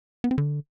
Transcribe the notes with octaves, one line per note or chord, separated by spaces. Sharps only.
B3
C4
D3